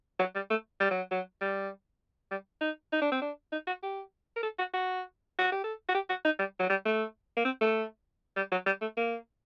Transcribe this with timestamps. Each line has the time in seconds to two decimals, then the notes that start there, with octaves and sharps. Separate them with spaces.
0.19 F#3
0.35 G3
0.50 A3
0.80 G3
0.91 F#3
1.11 F#3
1.41 G3
2.31 G3
2.61 D#4
2.92 D#4
3.01 D4
3.11 C4
3.22 D4
3.52 D#4
3.67 F#4
3.83 G4
4.36 A#4
4.43 A4
4.59 F#4
4.74 F#4
5.39 F#4
5.52 G4
5.64 A4
5.89 F#4
5.95 G4
6.09 F#4
6.25 D#4
6.39 G3
6.60 F#3
6.70 G3
6.85 A3
7.37 A#3
7.45 C4
7.61 A3
8.36 G3
8.52 F#3
8.66 G3
8.81 A3
8.97 A#3